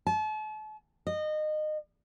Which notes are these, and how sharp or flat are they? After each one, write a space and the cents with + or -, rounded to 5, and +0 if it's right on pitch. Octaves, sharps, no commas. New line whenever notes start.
A5 -40
D#5 -25